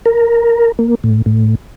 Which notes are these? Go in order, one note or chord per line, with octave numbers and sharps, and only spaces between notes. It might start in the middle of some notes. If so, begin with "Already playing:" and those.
A#4
A#3
A2
A2